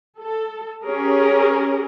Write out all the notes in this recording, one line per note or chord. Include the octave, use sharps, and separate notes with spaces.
A4
C#4 G4 G#4 A#4